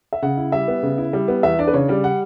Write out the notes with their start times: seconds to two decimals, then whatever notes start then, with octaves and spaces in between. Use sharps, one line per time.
0.13 E5
0.22 C#3 F#5
0.37 E4
0.52 G3 E5
0.68 B3
0.83 C#3
0.98 E4
1.13 G3
1.28 B3
1.43 E2 E5
1.59 D4 D5
1.67 B4
1.73 C#3 C#5
1.88 G3 D5
2.04 F#5